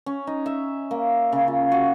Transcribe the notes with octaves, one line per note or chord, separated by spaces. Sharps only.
C#4
D#4
E5
A#3
C#3
F4
F#4